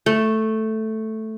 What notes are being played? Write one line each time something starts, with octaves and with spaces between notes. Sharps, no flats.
A3